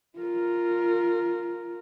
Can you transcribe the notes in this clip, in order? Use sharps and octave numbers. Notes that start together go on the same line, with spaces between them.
F4 A#4